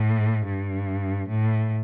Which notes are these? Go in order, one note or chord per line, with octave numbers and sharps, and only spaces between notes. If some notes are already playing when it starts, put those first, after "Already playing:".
Already playing: A2
G2
A2